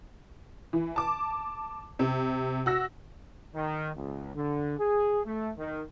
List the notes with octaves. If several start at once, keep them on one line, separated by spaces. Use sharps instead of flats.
E3
A5 D6
C3
F#4 E6 A#6
D#3
C#2
D3
G#4
A3
D#3